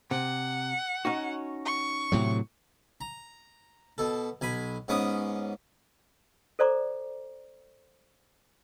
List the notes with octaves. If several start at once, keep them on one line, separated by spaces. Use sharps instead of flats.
C3 F#5
C#4 D#4 F#4
C#6
A2 C3 F#3
A#5
B2 A4
B1 G#5 B5
G#2 B3 C#4 D6 D#6
A4 C5 D5 A#5 D6